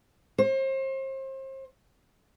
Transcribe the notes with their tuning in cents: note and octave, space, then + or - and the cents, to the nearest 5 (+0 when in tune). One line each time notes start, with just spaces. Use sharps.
C5 +35